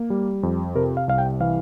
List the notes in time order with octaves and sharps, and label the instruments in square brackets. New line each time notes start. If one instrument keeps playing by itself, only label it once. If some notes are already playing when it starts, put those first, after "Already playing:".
Already playing: [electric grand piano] A#3
G3
F2
C3 A#4
F5
C2 F5
G5
E3 F5